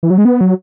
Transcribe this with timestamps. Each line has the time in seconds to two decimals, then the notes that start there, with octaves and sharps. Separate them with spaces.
0.03 E3
0.10 F#3
0.18 G#3
0.25 B3
0.41 F#3